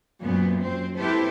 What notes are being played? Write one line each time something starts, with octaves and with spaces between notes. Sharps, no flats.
F#2 A#2 F#3 B3 C4
F#2 C4 C5
C4 E4 G4 A4 B4 C5